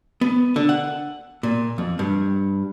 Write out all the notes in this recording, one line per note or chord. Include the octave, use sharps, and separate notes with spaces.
B3
D3
F#5
A#2
F2
G2